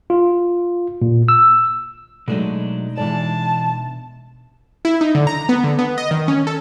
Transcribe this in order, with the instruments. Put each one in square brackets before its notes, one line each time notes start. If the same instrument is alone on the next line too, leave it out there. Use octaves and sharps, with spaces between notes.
[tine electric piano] F4
A#2
E6
[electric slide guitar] B2 D4 D#4 [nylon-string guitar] F#3 G#3 A3
[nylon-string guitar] E3 G#3 D5 [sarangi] A5
[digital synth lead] E4
D#4
D3
A#5
B3
D3
B3
D#5
D#3
C#4
A4